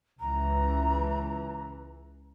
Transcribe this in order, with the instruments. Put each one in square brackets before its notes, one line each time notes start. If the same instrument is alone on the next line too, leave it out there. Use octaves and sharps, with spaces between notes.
[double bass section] C#2 E3 [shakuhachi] A#5